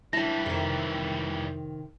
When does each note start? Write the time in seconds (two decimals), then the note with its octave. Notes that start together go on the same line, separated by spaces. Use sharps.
0.13 E3 G3 D4 E4 A5 A#6
0.46 F2 C3 D#3